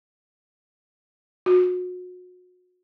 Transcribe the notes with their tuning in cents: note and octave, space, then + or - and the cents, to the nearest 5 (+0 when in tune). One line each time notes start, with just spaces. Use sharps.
F#4 -35